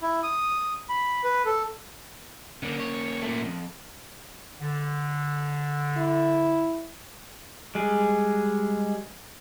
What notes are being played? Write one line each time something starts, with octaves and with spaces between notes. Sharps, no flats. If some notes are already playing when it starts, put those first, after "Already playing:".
E4
D#6
B5
B4
A4
D3 A#3 C#4
C#5
A#2 A3
F2
D3
E4
G3 G#3 G#4